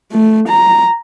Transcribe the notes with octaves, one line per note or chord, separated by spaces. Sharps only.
A3
A#5